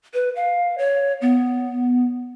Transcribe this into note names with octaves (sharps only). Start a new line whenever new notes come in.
B4
F5
C#5
B3